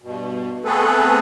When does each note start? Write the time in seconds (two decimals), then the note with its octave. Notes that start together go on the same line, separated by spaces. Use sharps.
0.02 G2 B2
0.65 A3 B3 C4 G#4 A4 B4